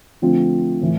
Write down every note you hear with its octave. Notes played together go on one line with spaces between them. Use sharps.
D3 F3 A3 C4 F4
A2 E3